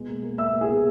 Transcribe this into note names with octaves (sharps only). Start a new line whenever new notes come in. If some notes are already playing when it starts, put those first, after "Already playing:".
Already playing: B2 G#3
A#3
A#3
A#3 E5 E6
A#3
G#4 G#5
B2